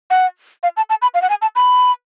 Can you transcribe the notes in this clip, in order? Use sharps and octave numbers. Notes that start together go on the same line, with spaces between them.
F#5
F5
A5
A5
B5
F5
F#5
G#5
A5
B5